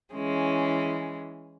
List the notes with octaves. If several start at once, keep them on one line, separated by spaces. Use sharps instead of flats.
E3 G#3 C#4